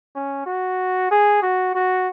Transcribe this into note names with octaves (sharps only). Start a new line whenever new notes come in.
C#4
F#4
G#4
F#4
F#4